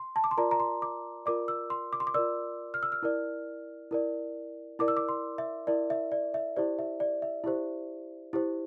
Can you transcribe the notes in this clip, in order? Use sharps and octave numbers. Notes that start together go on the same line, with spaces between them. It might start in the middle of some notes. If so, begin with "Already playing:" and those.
Already playing: C6
A5
D6
C6
F4 A#4 D5 A#5
A#5
C6
D6
F4 A#4 D5 D6
E6
C6
D6
C6
D6
F4 A#4 D5 E6
F6
E6
F6
E4 A#4 D5
E4 A#4 D5
E4 A#4 D5 D6
E6
D6
C6
E5
E4 A#4 D5
E5
D5
E5
E4 G4 C5 D5
E5
D5
E5
E4 G4 C5
E4 G4 C5